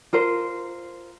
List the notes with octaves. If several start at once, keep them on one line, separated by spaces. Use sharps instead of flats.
F4 A#4 C5